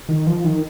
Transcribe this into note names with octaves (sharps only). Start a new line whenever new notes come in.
D#3
F3
D#3